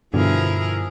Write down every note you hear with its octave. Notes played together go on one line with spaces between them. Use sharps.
G2 B2 D3 F3 E4 G#4 A#4